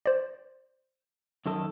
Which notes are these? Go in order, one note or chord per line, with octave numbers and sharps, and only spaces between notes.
C5 D5
F#2 D#3 A4